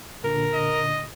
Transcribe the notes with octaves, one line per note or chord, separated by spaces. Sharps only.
A#2 D3 D4 A#4
D#5